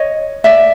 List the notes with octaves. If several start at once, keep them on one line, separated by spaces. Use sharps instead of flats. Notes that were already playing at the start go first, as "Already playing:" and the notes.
Already playing: C#5 D#5
D5 E5